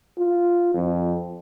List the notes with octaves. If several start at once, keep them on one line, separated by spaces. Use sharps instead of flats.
F4
F2